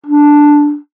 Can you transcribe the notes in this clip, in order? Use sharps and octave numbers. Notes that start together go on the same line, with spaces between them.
D4